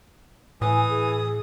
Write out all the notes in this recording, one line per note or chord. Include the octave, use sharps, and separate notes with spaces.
A2 E3 G#5 D#6
G#4